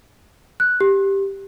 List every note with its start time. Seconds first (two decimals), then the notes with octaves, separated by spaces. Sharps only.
0.60 F#6
0.81 G4